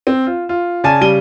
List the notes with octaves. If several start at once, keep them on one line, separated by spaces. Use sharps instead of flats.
C4
F4
F4
C#3 D5 G#5 A5 A6 D#7
C#3 G3 D#7 G7